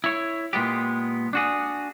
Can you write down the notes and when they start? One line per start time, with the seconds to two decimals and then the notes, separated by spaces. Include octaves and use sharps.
0.04 E4 C#5
0.53 A#2 G#3 B3 G4
1.33 D4 F#4 G#4